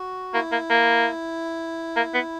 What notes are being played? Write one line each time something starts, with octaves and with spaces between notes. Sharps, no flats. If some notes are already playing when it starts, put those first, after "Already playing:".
Already playing: F#4
A#3 E4
A#3
A#3
A#3
B3